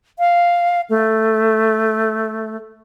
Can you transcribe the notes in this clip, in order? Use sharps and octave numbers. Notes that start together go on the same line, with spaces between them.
F5
A3